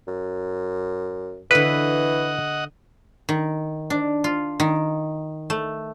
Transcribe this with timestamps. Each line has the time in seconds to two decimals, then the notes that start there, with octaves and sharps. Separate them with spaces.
0.08 F#2
1.51 D3 E3 A4 B4 D#5 F#5
3.29 D#3
3.90 D4
4.24 F4
4.60 D#3
5.50 A3